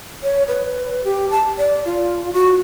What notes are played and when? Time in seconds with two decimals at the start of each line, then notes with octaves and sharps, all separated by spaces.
0.23 C#5
0.48 B4
1.04 G4
1.30 A5
1.58 D5
1.85 F4
2.33 F#4